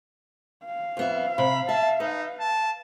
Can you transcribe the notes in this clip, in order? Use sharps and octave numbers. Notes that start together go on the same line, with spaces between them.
F5
F2 B3 E5
C3 B5
E5 A5
D#4 B4
A5